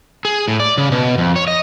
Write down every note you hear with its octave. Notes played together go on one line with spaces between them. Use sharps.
G#4
A2
D5
C#3
B2
F2
C#5
D#5